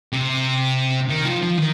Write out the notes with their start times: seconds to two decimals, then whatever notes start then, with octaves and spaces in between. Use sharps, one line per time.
0.13 C3
1.09 D#3
1.25 F3
1.42 F3
1.57 D#3